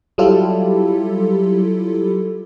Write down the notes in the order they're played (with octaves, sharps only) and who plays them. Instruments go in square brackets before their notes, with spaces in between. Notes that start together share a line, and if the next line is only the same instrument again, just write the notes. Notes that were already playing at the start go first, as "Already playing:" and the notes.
[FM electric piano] F#3 G3 E4 F4 G4 A4